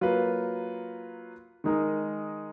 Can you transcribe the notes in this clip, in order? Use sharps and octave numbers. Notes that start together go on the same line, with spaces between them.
F#3 A#3 F4 B4
D#3 G#3 D#4 A#4